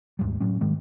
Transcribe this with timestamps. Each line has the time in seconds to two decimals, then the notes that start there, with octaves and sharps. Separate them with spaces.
0.19 D#2 G#2 G3
0.40 A2 F#3 C#4
0.61 G#2 D#3 G#3